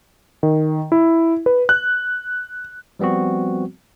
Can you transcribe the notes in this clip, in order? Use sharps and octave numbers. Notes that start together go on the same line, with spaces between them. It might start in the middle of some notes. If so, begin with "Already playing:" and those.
D#3
E4
B4
F#6
F3 G3 B3 C4 F#4